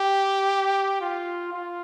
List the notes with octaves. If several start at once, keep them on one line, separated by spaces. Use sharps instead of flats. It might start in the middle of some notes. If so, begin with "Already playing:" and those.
Already playing: G4
F4
F4